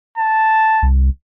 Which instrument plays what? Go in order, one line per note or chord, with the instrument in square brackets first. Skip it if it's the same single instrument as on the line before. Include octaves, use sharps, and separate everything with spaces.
[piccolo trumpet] A5
[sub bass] C2